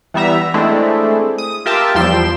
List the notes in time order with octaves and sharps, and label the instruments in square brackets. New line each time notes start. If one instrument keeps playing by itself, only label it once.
[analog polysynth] E3 G3 B3 E5 A#5
G#3 A3 C4 D4 E4
D#6
F4 G4 A#4 E5 G5 A5
E2 F3 G3 G5 C6 E7